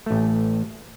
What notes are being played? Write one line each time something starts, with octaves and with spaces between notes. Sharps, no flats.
A1 A3